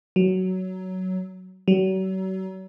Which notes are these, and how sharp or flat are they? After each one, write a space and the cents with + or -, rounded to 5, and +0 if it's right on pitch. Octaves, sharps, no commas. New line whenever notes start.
F#3 +10
F#3 +40